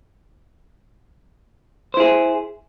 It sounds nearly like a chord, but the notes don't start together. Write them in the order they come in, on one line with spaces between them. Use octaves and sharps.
C5 E4 G#4